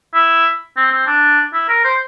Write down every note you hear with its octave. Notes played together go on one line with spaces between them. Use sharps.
E4
C4
C4
D4
E4
A#4
C5